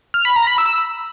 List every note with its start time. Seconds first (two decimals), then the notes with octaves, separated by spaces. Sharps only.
0.14 F6
0.25 B5
0.36 A#5
0.47 B5
0.58 E6